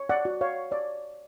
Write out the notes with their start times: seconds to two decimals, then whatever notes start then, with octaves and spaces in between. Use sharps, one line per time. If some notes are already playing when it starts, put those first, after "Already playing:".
Already playing: C#5
0.10 D5 F#5
0.25 F#4
0.41 C#5 F5
0.71 C#5 D5